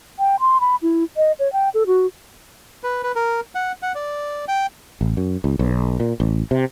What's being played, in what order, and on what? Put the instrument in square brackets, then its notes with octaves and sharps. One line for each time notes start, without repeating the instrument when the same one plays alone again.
[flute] G5
C6
B5
E4
D#5
C#5
G5
A4
F#4
[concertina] B4
B4
A#4
F#5
F#5
D5
G5
[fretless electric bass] A1
F#2
C#2
B1
A#2
A1
C3